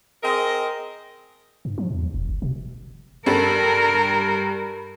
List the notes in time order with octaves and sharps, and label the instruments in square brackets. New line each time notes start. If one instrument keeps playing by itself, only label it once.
[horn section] C4 G#4 A#4 D#5
[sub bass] G2
F3
E2
E1
F#1
B2
[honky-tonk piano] G2 G3 A4 [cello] A#4